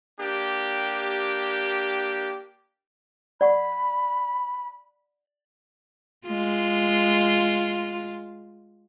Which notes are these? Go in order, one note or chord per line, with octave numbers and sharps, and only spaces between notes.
A#3 D4 G4
D5 F#5 B5 C#6
G#3 F4